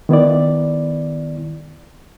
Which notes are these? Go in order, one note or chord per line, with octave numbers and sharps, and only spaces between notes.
D#3 B3 E4 D5